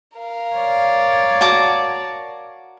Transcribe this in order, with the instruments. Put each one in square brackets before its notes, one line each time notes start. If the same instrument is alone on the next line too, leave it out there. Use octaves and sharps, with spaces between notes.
[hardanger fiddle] A#4 F5
[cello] C#5 D5
[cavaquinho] F#4 A5 D6